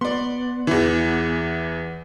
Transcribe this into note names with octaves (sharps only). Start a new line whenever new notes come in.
B3 D5 C6
E2 E3